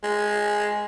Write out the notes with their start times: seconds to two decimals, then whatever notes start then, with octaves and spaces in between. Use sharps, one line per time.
0.03 G#3